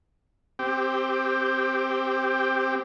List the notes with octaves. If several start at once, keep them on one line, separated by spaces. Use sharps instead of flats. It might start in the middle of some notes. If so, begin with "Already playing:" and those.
C4 G4